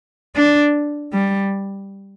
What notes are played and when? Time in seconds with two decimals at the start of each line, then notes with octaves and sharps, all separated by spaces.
0.35 D4
1.12 G3